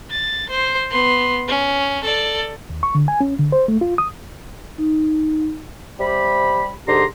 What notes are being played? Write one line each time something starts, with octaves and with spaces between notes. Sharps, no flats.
A6
C5
B3 C6
C#4
A4 D5
D#2
C#6
D3
G#5
C#4
D3
C5
A3
F4
D#6
D#4
C3 G3 G4 B5
G#2 D3 G4 G#4 A#5 C6